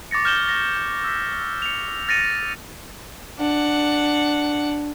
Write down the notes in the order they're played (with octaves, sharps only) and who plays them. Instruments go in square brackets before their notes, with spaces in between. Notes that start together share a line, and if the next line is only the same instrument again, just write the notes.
[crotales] C#6 D6 A6 A#6 C#7
F6 G6 E7 G7
A6 A#6
E6 B6
C#7 F7
F6 A6 A#6 C#7 D#7
[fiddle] D4 F#5